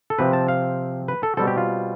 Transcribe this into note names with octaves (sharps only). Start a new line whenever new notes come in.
A4
C3 F3 C4 B4
A5
F5
B4
A4
B2 G3 C4 A4
G4
F4